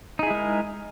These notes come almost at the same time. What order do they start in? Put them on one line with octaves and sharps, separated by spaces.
D#4 G#4 E4 G#3 A#4